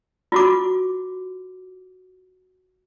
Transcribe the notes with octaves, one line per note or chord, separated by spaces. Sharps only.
F4 F#4 D6